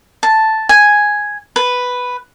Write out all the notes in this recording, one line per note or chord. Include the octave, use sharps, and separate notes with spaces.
A5
G#5
B4